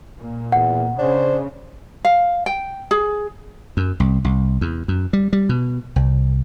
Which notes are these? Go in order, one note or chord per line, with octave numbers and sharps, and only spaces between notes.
A#2
E2 F#5
C#3 D4 C5
F5
G5
G#4
F#2
C2
C2
E2
F#2
G3
G3
B2
C2